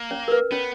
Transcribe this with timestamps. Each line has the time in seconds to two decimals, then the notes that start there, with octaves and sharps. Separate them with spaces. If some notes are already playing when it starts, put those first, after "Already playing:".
Already playing: A#3
0.11 C#4 C#5
0.28 A#4
0.32 B4
0.51 B3 C#4 C#5